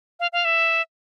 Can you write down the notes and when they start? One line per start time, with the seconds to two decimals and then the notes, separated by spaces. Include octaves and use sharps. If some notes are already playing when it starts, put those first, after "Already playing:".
0.20 F5
0.33 F5
0.45 E5